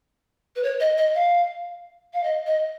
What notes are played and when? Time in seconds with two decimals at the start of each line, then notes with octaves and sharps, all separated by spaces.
0.56 B4
0.63 C#5
0.80 D#5
0.97 D#5
1.15 F5
2.13 F5
2.23 D#5
2.46 D#5